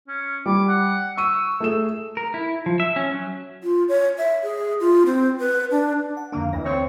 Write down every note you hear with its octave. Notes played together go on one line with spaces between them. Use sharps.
C#4
G3 D6
F#5
C#6 E6 D#7
A3 G#4 E7
A#4
E4
F3
E5
C#4
F#3
F4
C#5
E5
G#4
F4
C4
B4
D4
F#5
F2 D3 A#3 D4
D2 E3 A#6
C4 C#5